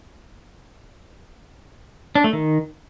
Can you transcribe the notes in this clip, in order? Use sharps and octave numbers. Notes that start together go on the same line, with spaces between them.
D4
A3
D#3